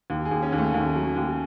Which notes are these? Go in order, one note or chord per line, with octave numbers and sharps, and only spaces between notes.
D#2
G#4
D#2
C#4
D#2
A3
D#2
F#3
D#2